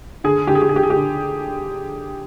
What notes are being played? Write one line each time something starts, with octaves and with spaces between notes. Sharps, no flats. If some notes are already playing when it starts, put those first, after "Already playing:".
D3 G#4
D3 G4
G#4
G4
G#4
D3 G4
G#4
G4
D3